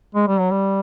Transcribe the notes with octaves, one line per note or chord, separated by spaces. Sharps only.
G#3
G3
F#3
G3